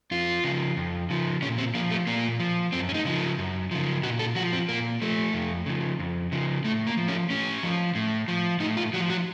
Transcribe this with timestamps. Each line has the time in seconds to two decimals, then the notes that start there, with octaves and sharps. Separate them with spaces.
0.11 F2 F4
0.44 C#3 F3
0.77 F2
1.10 C#3 F3
1.42 A#2 C#4
1.58 C4
1.74 F3 A#3
1.91 A3
2.07 A#2 A#3
2.40 F3
2.72 F#2 C4
2.89 C#4
2.94 D#4
3.05 C#3 F3
3.38 F#2
3.71 C#3 F3
4.03 A#2 F#4
4.19 A4
4.35 F3 F#4
4.53 C4
4.68 A#2 A#3
5.02 F3 A3
5.34 F2
5.66 C#3 F3
6.00 F2
6.32 C#3 F3
6.64 A2 A3
6.87 A#3
6.97 F3
7.08 C#4
7.30 A2 C#4
7.63 F3
7.95 A2
8.28 F3
8.60 A2 D#4
8.77 F4
8.93 F3 F#4
9.10 F#4